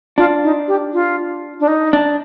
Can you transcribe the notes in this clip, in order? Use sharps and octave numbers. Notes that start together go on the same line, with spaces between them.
D4 F4
D#4
G4
F4
D4
D#4
D4